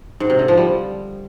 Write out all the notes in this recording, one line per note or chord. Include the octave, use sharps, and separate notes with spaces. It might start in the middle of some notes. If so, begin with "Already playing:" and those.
G#2
C3
D3
F3
G3